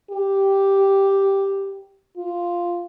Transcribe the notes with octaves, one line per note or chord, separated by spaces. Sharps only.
G4
F4